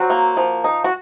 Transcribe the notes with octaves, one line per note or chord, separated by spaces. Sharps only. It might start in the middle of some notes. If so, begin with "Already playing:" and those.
Already playing: F#3 C4 F#4
A#3
F3
D#4
F#4